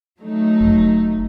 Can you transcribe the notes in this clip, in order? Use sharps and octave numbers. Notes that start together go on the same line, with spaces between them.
F#3 A3 D#4
F1